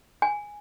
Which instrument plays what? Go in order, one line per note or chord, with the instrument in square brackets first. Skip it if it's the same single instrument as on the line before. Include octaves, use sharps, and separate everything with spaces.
[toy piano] G#5